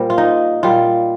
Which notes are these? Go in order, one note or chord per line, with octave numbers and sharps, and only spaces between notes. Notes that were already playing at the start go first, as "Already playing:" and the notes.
Already playing: A#2 G3 A#4 C5
F4
D#4
A#2 G3 F4